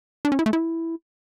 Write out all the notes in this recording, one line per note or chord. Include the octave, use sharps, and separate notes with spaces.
D4
C#4
E4
A3
E4